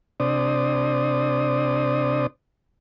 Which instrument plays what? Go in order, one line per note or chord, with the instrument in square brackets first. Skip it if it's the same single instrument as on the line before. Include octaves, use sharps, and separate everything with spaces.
[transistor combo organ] C3 D4 C5 D5 D#6